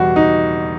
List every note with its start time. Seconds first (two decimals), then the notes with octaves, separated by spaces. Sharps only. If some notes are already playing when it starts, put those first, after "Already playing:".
Already playing: E2 B2 G3 F#4
0.16 D#4